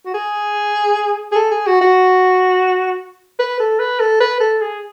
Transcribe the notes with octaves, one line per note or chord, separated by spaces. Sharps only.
F#4
G#4
G#4
A4
G#4
F#4
F#4
B4
A4
B4
A4
B4
A4
G#4